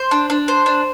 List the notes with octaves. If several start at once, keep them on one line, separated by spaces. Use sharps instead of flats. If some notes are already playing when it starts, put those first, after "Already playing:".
Already playing: C5
D4
D4
C5
D4